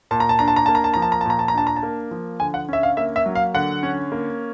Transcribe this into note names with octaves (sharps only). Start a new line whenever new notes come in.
A#2 A5
A#5
A5
D4 A#5
A5
A#5
A#3 A5
A#5
A5
F3 A#5
A5
A#5
A5
A#2 A#5
A5
A#5
D4 A5
A#5
A5
A#3
F3
D3 G#5
F#5
C#4 E5
F5
A#3 E5
E5
F#3
F5
D3 F#5
C#4
A#3